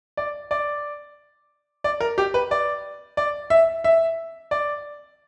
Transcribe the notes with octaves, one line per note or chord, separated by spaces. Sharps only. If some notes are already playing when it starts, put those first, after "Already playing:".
D5
D5
D5
A#4
G4
B4
D5
D5
E5
E5
D5